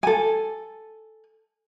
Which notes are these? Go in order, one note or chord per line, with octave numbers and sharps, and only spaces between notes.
A4 G#5